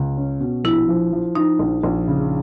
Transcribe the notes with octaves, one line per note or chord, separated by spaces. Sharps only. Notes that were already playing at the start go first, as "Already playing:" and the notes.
Already playing: C#2
C#4
B2
A#1 E4
F3
F3
F3 D#4
A#1
A#1
C#3